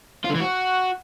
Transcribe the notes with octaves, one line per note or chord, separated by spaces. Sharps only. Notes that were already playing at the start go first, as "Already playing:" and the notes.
F4
D3
E3
F#4